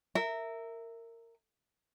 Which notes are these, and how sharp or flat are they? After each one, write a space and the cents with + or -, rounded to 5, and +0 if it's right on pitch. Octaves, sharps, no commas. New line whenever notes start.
A#4 -20 E5 +0